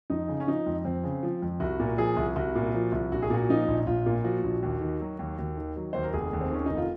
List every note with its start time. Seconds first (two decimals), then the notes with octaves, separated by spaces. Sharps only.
0.10 F2 D#4
0.28 C#3
0.40 C#4
0.47 F3 D#4
0.66 F2
0.85 F2 C4
1.04 C#3
1.23 F3
1.42 F2
1.60 C2 F#4
1.80 A#2
1.98 F3 G#4
2.17 C2
2.36 C2 F#4
2.55 A#2
2.74 F3
2.92 C2
3.12 A#1 F#4
3.22 G#4
3.30 A#2 F#4
3.49 F3 D#4
3.68 A#1
3.87 A#1 F4
4.06 A#2
4.24 F3 F#4
4.44 A#1
4.63 D#2
4.81 D#3
5.01 F#3
5.19 D#2
5.39 D#2
5.57 D#3
5.76 F#3
5.93 D#2 C5
6.03 A#4
6.13 F1 G#4
6.33 D#2
6.41 C4
6.51 D#3 C#4
6.66 F1 D#4
6.77 F4